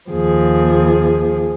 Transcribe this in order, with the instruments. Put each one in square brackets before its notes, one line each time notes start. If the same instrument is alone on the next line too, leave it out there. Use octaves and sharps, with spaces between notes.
[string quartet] D#2 F3 G#4